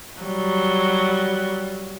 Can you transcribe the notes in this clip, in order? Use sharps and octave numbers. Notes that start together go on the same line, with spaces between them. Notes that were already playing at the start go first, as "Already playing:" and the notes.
F#3 G3